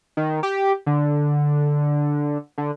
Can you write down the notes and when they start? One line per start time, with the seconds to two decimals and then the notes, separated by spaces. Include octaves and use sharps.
0.17 D#3
0.43 G4
0.86 D3
2.58 D3